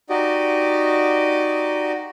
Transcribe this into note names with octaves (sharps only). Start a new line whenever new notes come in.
D#4 F#4 G4 D5 D#5